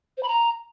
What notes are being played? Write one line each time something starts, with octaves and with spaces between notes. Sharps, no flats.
C5
B5
A#5